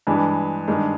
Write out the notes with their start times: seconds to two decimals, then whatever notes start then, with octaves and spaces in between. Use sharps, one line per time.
0.07 G2 E3 G#3
0.68 G2 D#3 G#3